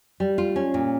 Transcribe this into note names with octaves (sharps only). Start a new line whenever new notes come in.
G3
F4
C#4
A#2